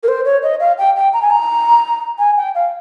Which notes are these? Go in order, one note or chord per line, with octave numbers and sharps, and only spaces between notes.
A#4
C5
C#5
D#5
F5
G5
G5
A#5
G#5
A#5
G#5
G5
F5